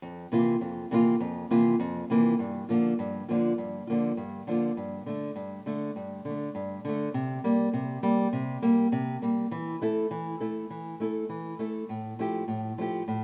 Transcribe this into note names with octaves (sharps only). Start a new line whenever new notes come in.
F2
C3 E3 A#3 F4
F2
C3 E3 A#3 F4
F2
C3 E3 A#3 F4
F2
C3 E3 A#3 F4
G2
D3 F3 A#3 F4
G2
D3 F3 A#3 F4
G2
D3 F3 A#3 F4
G2
D3 F3 A#3 F4
G2
D3 A3
G2
D3 A3
G2
D3 A3
G2
D3 A3
C3
G3 A#3
C3
G3 A#3
C3
G3 A#3
C3
G3 A#3
E3
A3 E4 A4
E3
A3 E4 A4
E3
A3 E4 A4
E3
A3 E4 A4
A2
F3 A3 E4 G4
A2
F3 A3 E4 G4
A2